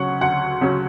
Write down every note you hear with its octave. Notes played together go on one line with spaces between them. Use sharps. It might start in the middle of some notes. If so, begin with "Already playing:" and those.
Already playing: D2 C#3 F#3 C#4 F#5 C#6
D2 F#5
C#3 F#3 C#4